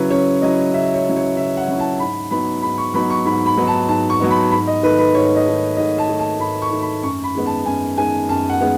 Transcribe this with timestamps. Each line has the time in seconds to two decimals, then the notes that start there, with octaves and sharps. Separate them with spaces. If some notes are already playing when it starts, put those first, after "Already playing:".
Already playing: C#3 F#3 C#4 E4 B4
0.10 C#3 C#5
0.42 F#3 C#4 E4 D#5
0.73 C#3 E5
0.94 C#5
1.05 F#3 C#4 E4
1.16 C#5
1.37 C#3 E5
1.57 F#5
1.68 F#3 C#4 E4
1.79 A5
1.99 G#2 B5
2.31 F#3 B3 D#4 B5
2.62 G#2 B5
2.78 C#6
2.94 F#3 B3 D#4 B5
3.10 C#6
3.25 G#2 B5
3.46 B5
3.57 F#3 B3 D#4
3.67 A5
3.88 G#2 A5
4.10 C#6
4.20 F#3 B3 D#4
4.31 B5
4.51 G#2 B5
4.67 D#5
4.83 D#3 A3 B4
4.98 B4
5.15 G#2 C#5
5.36 D#5
5.46 D#3 A3
5.77 G#2 D#5
5.98 A5
6.09 D#3 A3
6.19 A5
6.40 G#2 B5
6.62 C#6
6.71 D#3 A3
6.82 B5
7.03 F#2 C#6
7.24 B5
7.35 D#3 G#3 B3
7.46 A5
7.66 F#2 G#5
7.98 D#3 G#3 B3 G#5
8.29 F#2 A5
8.50 F#5
8.61 D#3 G#3 B3